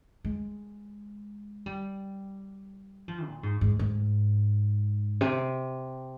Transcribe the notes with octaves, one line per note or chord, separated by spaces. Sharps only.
G#3
G3
F3
A#2
G#2
G#2
G#2
C3